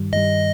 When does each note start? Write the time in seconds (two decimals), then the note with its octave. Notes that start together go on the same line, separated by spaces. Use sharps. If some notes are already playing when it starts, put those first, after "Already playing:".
Already playing: G2 D#3 G3
0.13 G2 D#3 G3 D#5